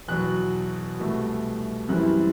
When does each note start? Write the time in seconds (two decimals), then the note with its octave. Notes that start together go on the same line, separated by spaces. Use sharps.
0.08 E2 B2 F#3 F#6
1.00 C2 B2 A3
1.89 F#2 E3 G3 C4 E4 F#6